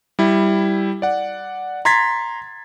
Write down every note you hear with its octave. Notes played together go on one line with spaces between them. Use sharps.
G3 E4
D5 F#5
A#5 C6 G#6 A6 B6